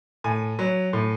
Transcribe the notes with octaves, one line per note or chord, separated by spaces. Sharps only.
A2 G#5
F#3
A2